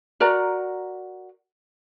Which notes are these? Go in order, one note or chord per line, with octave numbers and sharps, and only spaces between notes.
F#4 A#4 D5 A#5